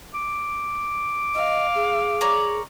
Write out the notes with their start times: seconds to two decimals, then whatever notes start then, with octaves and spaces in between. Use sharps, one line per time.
0.14 D6
1.35 D#5 F5
1.75 G#4
2.21 A#4 C#5 D5